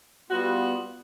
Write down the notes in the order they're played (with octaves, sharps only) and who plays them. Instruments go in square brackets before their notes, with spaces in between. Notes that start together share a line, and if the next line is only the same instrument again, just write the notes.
[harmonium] G3 B3 F4 [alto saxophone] F#4